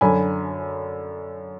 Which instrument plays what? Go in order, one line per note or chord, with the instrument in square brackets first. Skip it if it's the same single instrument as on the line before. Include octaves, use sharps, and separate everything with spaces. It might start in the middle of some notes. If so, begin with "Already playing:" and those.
[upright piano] F#2 D3 G#5 B5